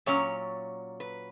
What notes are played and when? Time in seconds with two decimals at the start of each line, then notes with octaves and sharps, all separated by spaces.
0.06 A#2 F#3 C#4 C#5
1.00 B4